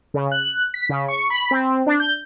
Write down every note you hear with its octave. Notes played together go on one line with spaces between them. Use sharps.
C#3
F#6
B6
C#3
C#6
B5
C4
D4
G6